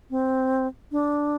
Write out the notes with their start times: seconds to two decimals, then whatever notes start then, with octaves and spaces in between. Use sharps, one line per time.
0.10 C4
0.92 D4